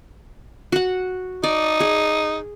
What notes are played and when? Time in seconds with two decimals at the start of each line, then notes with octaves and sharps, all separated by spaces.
0.72 F#4 F#5
1.43 D#4 D5
1.80 G#4